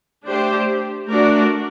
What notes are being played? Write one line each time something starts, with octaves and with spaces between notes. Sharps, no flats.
A3 D4 G4 C5
A3 D4 F#4 A#4 D5